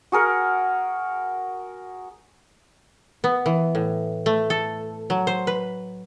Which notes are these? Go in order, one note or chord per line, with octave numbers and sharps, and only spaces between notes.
F#4 G#4 A#4 F#5
B3
E3
A2
A3
A4
F#3
C5
B4